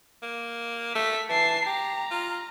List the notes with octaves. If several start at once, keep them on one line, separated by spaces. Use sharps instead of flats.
A#3
A3 B6
E3 A5 C7
G4 A#5
F4